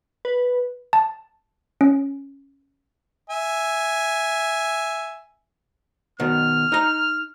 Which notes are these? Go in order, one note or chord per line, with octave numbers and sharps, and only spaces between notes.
B4
A5
C#4
E5 G#5
B2 D#3 F6
D#4 A#5